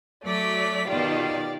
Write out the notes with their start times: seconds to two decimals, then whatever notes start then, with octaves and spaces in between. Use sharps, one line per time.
0.24 F#3 A3 D5 B6
0.88 B2 D#3 F4 G4 D5